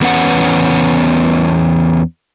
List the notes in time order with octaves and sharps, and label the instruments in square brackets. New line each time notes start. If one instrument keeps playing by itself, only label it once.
[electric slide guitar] E2 B3 C#4 F#5